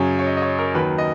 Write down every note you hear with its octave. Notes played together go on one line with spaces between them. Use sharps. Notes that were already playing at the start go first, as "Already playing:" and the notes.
Already playing: F#2 C#3 F#3 C#5
C#5
D#5
D#5
C#5
A#4
D#2 D#3 F#3 B4
D#5